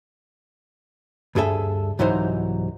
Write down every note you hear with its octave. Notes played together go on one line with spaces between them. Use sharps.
D2 G2 G#4 A4 E5
C2 G#2 E3 F#3 D#4 C5